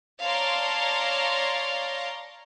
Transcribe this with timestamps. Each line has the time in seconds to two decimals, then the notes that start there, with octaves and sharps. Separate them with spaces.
0.22 C#5 D5 F5 A5 A#5 C6